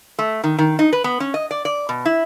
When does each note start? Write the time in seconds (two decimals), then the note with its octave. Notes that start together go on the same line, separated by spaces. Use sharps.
0.19 A3
0.44 D#3
0.59 D#3
0.79 D#4
0.93 B4
1.04 B3
1.20 C#4
1.34 D#5
1.51 D5
1.65 D5
1.89 B2
2.05 E4